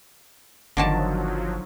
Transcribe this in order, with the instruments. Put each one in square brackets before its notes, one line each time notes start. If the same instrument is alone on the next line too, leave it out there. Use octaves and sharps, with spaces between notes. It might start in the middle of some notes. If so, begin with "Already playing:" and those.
[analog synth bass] G1 [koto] D3 D#3 A5 [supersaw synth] F3 F#3